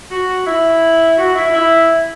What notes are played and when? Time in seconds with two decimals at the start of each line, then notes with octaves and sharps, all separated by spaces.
0.11 F#4
0.46 E4
1.18 F#4
1.35 E4
1.53 E4